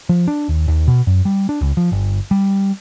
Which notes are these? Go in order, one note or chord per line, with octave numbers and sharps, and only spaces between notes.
F3
D4
D#2
D#2
B2
F#2
G3
D4
C#2
F3
G1
G3